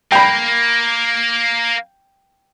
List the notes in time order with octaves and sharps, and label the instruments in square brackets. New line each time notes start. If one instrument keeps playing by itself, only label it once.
[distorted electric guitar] A#3 [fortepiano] G5 B5